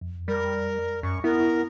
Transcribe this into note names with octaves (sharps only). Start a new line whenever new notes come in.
F2
G3 A#4
F#2 C#6
B3 E4 A#4